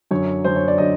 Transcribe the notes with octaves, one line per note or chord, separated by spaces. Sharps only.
F#2 D3 F#3 C#5
F#2 D3 F#3 C5
C#5
D5
D3 F#3 D#5